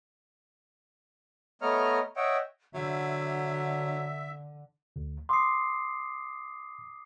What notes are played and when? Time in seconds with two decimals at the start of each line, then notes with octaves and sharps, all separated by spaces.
1.62 A3 B3 C#5 D#5 A#5 F6
2.16 C#5 D#5 E5 F#5 G5
2.74 D3 F#3 D4 E5
4.96 D2
5.29 C6 D6 D#6 C7